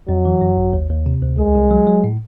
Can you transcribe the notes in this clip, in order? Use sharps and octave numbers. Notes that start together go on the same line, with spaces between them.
F2 F#3
E3
F#2
G#1
D#2
D#2
C3
D2
C2 G#3
C2
F#3
F#3
A2